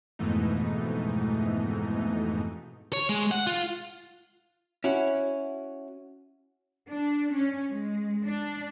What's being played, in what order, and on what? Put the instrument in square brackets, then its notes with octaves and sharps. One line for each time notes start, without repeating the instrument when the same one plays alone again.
[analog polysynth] F2 G#2 B2 E3 A3 D#4
[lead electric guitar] C#5
G#3
F#5
F4
[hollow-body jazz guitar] C#4 E4 F#4
[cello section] D4
C#4
G#3
D4